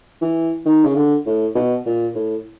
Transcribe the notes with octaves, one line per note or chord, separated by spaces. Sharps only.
E3
D#3
C#3
D3
A2
B2
A#2
A2